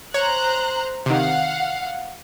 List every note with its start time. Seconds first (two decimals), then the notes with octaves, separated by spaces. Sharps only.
0.14 C5 C#5 A#5 F#6
1.06 C3 D#3 F5 F#5